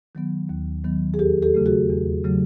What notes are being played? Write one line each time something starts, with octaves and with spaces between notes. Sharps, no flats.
D#3 F#3 B3
D#2
D#3 F#3 B3
G#4
E2 G4 A4
G4 A4
C#3 F#3 A3
F#4 G#4
E2
C#3 F#3 A3